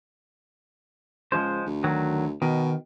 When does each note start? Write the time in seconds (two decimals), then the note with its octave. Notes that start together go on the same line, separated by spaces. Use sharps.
1.32 C#2 F3 G#3 C5
1.66 D2
1.84 D#3 F#3
2.42 B2 D#3